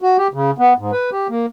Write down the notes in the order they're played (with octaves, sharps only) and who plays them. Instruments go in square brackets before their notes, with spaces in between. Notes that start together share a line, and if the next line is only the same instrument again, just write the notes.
[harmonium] F#4
G4
C#3
B3
G#2
B4
G4
A#3